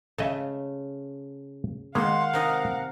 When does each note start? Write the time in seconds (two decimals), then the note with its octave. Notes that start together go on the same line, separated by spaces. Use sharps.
0.18 C#3 A3 A4 D#5 E5
1.95 D#3 G#3 A#3 F5 F#5 C6
2.33 C3 D#4 A#4 D#5